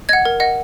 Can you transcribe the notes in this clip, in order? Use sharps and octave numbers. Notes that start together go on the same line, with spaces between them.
D#5 F#5 G#6
A#4
D#5 F#5